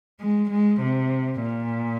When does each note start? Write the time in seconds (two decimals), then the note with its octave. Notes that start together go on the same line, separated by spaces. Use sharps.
0.20 G#3
0.51 G#3
0.81 C3
1.42 A#2